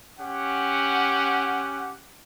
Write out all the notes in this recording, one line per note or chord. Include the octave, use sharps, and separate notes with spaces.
C#4 G4 F#5